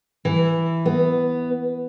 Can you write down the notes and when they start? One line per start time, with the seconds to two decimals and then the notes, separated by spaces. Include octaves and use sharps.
0.25 E3
0.85 B3